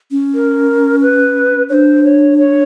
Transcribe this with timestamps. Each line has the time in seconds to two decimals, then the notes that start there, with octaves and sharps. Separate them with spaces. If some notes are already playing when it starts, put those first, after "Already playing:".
0.11 C#4
0.35 A#4
1.01 B4
1.69 D4 C5 C#5
2.04 C#5
2.38 C#5